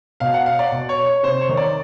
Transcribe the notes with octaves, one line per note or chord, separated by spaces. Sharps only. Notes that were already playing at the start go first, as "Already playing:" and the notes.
B2 F5
F#5
F5
D5
B2
C#5
C#5
C3 C5
C#5
D#3
D5